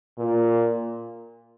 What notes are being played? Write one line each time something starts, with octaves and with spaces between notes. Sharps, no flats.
A#2